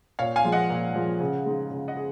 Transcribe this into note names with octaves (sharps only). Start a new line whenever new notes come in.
A#2 C#5 F5
F5 G#5
F3 G#3
D#5 F#5
A#2
F3 G#3
C#3
G#3 D#4 G#4
C#3
D#5 F#5
G#4